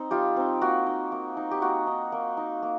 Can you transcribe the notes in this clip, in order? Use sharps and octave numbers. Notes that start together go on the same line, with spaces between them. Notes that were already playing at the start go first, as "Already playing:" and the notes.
Already playing: C4 D#4
G3 F4 G4
C4 D#4
A#3 F#4
D#4
A#3
D#4
G4
A#3 F#4
D#4
A#3
D#4
A#3